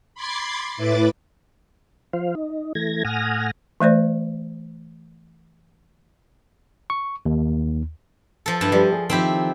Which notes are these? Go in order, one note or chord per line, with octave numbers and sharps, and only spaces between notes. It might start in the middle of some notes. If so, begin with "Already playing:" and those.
B5 C6 D6 G#6 A6 C7
A2 E4 B4 D6 A6
F3 C5 F5
D#4
E3 A3 G#6 A#6
A2 F#5 G#5 D#6 F6 A#6
E3 A3 C5 D5
C#6
D#2
F3 A4
G2 E4 A5
F3 G3 B4
G#4
D#3 F3 C4 E4 G4